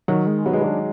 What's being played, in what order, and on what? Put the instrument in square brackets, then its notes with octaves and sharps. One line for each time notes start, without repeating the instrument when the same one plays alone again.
[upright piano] D#3 [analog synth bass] F#3
[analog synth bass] G#3
[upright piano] F#3 [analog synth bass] B3
[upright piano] G#3
F#3
[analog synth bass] D4